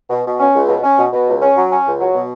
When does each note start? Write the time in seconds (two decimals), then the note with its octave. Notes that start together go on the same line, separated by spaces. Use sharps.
0.10 B2
0.26 B2
0.40 C#4
0.55 C#2
0.69 B2
0.84 C#4
0.98 B2
1.13 B2
1.28 C#2
1.42 C#4
1.56 F#3
1.71 C#4
1.86 C#2
2.00 F#3
2.14 B2